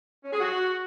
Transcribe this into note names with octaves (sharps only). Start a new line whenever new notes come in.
C#4
G#4
F#4